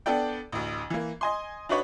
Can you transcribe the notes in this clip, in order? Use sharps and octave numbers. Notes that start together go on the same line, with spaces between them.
B3 D4 A4 D5 G5
A1 D2
E3 A#3
D#5 G#5 C6
D4 D#4 F#4 B4 C#5 D5